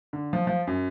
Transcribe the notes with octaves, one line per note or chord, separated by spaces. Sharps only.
D3
F3
F3
F#2